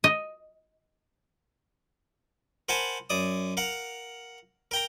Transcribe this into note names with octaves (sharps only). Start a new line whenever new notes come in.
D#5
A#4 C5 F#5 G#5 A5 B5
F#2 D5 D#6
A#4 F5 F#5
A#4 G5 A#5